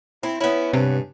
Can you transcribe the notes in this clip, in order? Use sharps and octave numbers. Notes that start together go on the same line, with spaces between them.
C4 E4
B3 C#4 E4
G2 C3